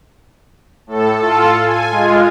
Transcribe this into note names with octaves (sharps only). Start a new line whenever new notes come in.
A2 A4
F4 A4
G#5
G#3 F4